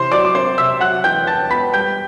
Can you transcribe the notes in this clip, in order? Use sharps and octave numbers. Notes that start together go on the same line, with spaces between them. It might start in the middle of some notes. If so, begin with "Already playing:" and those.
Already playing: C3 E3 C5 C6
F#3 D5 D6
D6
C4 C5 C6
C3 E5 E6
F#3 F#5 F#6
E2 G5 G6
E2 A5 A6
B3 B5 B6
G3 G5 G6